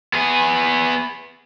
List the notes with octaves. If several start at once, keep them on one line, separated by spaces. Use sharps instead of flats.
B3 G#4